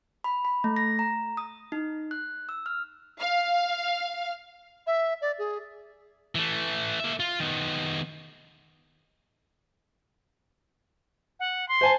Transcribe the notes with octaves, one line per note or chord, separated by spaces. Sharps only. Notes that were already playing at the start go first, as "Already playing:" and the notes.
B5
B5
A3
A#6
A#5
D#6
D#4
F#6
E6
F6
F5
E5
D5
G#4
E3 A3
A#3 E5
F4
D#3 B3
F#5
C6
C5 G#5 A5